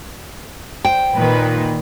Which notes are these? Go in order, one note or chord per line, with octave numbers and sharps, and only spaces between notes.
C5 G5
A#2 D#3 B4